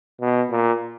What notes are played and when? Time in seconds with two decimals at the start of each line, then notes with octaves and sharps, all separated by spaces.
0.21 B2
0.51 A#2